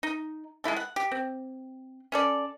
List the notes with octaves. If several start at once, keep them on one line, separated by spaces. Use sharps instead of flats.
D#4
G#3 A3 E4 A4
F#5
G4
C4
C#4 A4 D5